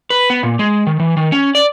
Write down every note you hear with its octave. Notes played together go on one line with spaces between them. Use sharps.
B4
B3
A#2
G#3
D#3
E3
D#3
C#4
D5